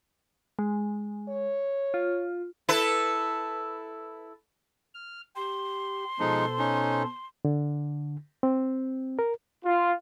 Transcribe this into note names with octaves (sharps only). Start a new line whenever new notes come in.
G#3
C#5
F4
E4 A4 B4
F6
G4 C6
B2 F3 G#3 D#4 A4 C5
C#4 D#4
D3
C4
A#4
F4